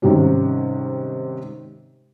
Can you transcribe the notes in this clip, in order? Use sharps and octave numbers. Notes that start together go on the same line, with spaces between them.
G#2 C3 D#3 G3 C#4